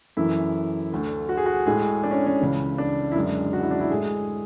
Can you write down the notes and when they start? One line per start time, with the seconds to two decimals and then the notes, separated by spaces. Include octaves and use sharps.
0.17 F#2 E3 A3 E4
0.92 D2 D3 A3
1.29 F#4
1.38 G#4
1.46 F#4
1.66 A2 G#3 G#4
2.04 D4
2.11 C#4
2.27 C#4
2.41 C#2 C#3 E3
2.78 D4
3.12 E4
3.16 F#2 D3 G#3 D4
3.53 F#4
3.62 E4
3.71 D4
3.80 E4
3.90 A2 G#3 G#4